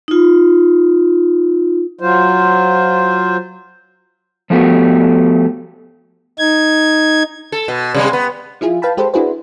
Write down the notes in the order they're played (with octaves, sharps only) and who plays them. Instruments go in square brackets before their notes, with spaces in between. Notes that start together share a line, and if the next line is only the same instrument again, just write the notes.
[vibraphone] D#4 F4
[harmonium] F#3 F4 C5
[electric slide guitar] F3 A3 B3 F#4 G4
[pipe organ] D#4 G#6
[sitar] A4
B2
C3 G3 G#3
B3
[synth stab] F3 E4 F4 G#4
B4 F5 G5 A5 B5
G#3 G4 A4 B4 C5
D4 E4 F#4 G#4 B4 C5